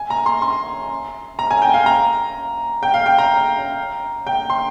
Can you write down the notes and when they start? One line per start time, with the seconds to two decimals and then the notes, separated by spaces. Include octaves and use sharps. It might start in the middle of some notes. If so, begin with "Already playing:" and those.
Already playing: G#5
0.10 A#5
0.26 C6
0.42 C6
1.39 A#5
1.51 G#5
1.62 G5
1.74 F5
1.86 A#5
2.83 G5
2.94 F5
3.06 G5
3.18 A#5
4.27 G5
4.50 C6